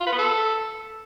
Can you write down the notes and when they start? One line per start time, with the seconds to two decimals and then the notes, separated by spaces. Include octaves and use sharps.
0.01 F4
0.07 B4
0.13 B3
0.19 A4